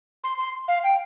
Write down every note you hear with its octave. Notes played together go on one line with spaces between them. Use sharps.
C6
C6
F5
G5